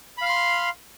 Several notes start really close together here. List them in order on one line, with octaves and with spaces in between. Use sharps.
B5 F5 F6 C6